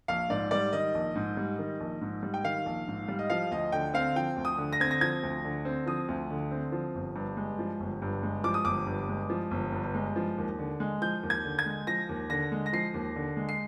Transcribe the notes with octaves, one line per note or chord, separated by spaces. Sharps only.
A#1 F5
G#2 D5
G3 D5
D#3 D#5
A#1
G#2
G3
D#3
A#1
G#2
G3
G5
D#3 F5
A#1
G#2
G3
D#5
F3 F5
D2 D#5
D3 G5
C4 F5
F3 G5
D2
D#6
D3
A#6
C4 G#6
A#6
F3 G#6
D2
D3
C4
F3 D#6
D2
D3
C4
F3
G1
G2
G#3
F3
G1
G2
G#3
F3 D6
D#6
G1 D6
G2
G#3
F3
G1
G2
G#3
F3
D#2
D3
G#3
F3 G6
D#2
G#6
D3
G#6
G#3
F3 A#6
D#2
D3 A#6
G#3
A#6
F3 C7
D#2
D3
G#3
C7